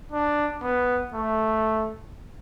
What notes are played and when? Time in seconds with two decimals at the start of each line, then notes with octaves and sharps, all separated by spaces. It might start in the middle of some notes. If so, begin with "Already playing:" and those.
0.12 D4
0.62 B3
1.14 A3